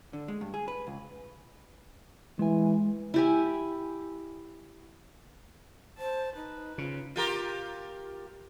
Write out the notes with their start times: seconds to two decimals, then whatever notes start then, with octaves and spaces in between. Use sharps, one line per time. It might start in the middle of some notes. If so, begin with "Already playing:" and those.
0.13 D3
0.28 G#3
0.41 G2
0.54 G#4
0.68 B4
0.87 C#2
2.39 E3 G#3 G#5
3.14 E4 G4 G#5
5.98 C5 A5
6.36 D#4 B4
6.78 C#3 F4
7.16 F4 G4 A#4